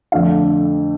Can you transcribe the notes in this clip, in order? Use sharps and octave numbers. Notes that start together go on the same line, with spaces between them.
F2 D3 A3 D4 F5